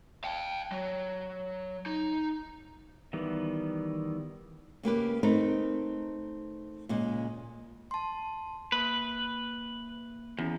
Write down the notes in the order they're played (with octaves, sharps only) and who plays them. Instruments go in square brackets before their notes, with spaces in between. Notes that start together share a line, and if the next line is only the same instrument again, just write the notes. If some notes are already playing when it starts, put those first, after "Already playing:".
[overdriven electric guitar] F5 G5
F#3
D#4
[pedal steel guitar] D#3 E3 G3 B3
[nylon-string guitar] C#3 A#3 G4 B4
A3 C4 D#4 A#4 B4
A#2 C#3 G#3
[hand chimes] A5 C6
[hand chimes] A#3 [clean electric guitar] B4
[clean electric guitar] E2 [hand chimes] C#4 E4